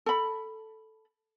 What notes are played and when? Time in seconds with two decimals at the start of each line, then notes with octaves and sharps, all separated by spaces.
0.06 A4 B5